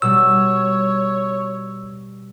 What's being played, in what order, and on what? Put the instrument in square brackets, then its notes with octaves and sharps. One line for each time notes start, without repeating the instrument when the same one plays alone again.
[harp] B2 G3 [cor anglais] C#5 [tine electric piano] E6